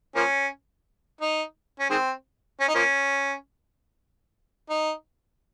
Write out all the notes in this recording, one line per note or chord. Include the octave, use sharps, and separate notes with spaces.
F3 A#3 C#4
D#4
C#4
D#3 G#3 C4
C#4
D#4
F3 A#3 C#4
D#4